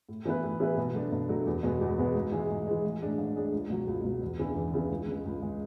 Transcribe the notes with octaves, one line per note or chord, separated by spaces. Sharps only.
A2
E3 B3 E4 B4
A2
E3 B3 E4 B4
B2
F#3 A3 D4
B2
F#3 A3 D4
E2
B2 G#3 B3 F#4
E2
B2 G#3 B3 F#4
G#2
E3 G#3
G#2
E3 G#3
A1
A2 G#3 D4 G#4
A1
A2 G#3 D4 G#4
C#2
B2 F#3
C#2
B2 F#3
E2
C#3 E3 B3 D4
E2
C#3 E3 B3 D4
C#2
C#3 G#3
C#2
C#3 G#3